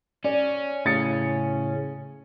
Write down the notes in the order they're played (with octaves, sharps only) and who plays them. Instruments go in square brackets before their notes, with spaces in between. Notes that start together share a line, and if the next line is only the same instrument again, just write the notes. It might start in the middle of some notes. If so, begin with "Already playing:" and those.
[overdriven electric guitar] C#4 [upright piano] D5
[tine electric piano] A2 C#3 G#4 [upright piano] G#5 A6 C#7